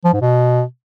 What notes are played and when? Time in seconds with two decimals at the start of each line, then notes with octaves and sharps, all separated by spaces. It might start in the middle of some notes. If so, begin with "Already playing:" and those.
0.05 F3
0.13 G#2
0.21 B2